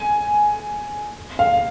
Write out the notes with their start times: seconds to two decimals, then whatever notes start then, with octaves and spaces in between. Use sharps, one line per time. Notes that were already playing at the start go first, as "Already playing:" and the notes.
Already playing: G#5
1.39 F5